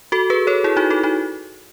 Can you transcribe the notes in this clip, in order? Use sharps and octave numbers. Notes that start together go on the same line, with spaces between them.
F#4 A4
G#4 B4
A4 C#5
E4 G#4
D#4 F#4
F#4 A4
D#4 F#4